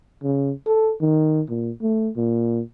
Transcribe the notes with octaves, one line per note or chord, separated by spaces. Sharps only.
C#3
A4
D#3
A#2
A3
A#2